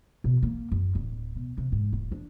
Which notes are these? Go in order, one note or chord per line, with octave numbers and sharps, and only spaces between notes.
B2
A#3
F#2
D1
B2
C3
G#2
D#1
D4